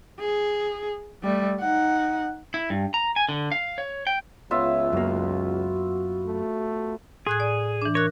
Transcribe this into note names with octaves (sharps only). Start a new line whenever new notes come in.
G#4
G3 A3
D#4 F#5
E4
G2
A#5
G#5
D3
F5
C#5
G5
C#2 B3 F4 C#5 E5
F#2 A#3 F#4
A3
A2 G#4 F#6 G#6
D5
E3 D4
A#4 C#5 F#6